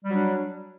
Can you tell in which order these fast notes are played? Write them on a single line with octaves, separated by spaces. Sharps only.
G3 F#3 D4